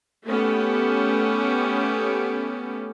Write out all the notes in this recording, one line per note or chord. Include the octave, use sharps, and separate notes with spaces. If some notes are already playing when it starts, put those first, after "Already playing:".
A3 B3 C#4 G4